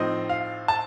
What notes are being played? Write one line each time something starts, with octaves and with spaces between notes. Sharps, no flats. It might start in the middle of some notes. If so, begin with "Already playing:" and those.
Already playing: A2 F3 C4 D#4 D#5
F5
A5